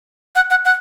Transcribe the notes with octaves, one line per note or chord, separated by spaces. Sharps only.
F#5
F#5
F#5